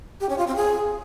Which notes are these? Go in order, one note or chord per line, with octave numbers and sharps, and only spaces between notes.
G4
C#4
F4
C4
G#4